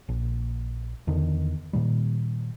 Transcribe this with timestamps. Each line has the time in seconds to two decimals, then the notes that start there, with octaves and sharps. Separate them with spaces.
0.09 A#1
1.07 E2 D3 D#3
1.73 A#2 D#3 G3